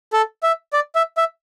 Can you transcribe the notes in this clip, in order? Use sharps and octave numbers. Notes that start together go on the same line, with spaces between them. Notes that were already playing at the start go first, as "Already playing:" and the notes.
A4
E5
D5
E5
E5